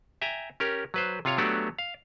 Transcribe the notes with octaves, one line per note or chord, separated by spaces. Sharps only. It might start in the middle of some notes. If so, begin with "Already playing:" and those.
E5 G5 G#5 A#5
C#4 G4 A#4
F#3 B4 C5
C3 F4 C#5 F5
F#3 A3 B3 D4 F#4 G4
F5